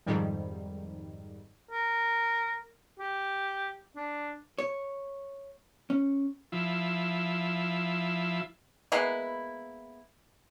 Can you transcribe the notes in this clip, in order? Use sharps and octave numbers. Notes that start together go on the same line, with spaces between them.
F2 G#2 D#3 G3
A#4
G4
D4
C#5
C#4
F3 E4
G#3 A#3 B3 E4